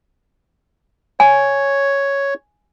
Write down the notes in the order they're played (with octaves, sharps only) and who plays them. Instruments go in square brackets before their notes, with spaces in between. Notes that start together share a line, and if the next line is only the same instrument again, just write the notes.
[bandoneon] C#5 [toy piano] G#5